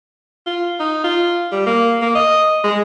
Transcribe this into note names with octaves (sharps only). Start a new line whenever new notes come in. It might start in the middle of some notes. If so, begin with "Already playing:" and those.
F4
D#4
F4
G3
A#3
A#3
D#5
G#3